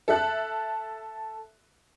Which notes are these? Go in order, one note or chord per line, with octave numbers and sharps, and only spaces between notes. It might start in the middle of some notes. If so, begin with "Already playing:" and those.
A4 E5 F#6